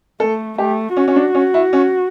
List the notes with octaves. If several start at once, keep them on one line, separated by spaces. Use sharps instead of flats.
A3 A4
A3 G4
C#4 F#4
C#4
D4
C#4
E4
C#4